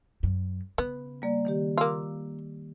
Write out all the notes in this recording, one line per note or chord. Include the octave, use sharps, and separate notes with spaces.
F#2
C#3 B3
G3 A#3 D5
D#3 A#3 G4
A#3 F4 D6 E6